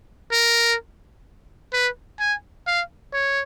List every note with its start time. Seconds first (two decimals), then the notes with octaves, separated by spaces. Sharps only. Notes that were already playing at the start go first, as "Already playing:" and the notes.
0.32 A#4
1.73 B4
2.20 G#5
2.67 F5
3.13 C#5